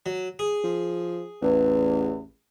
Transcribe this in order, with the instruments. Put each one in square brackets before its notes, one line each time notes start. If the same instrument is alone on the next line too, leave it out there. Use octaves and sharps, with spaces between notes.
[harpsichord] F#3
G#4
[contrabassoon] F3
[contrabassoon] A1 [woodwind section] E2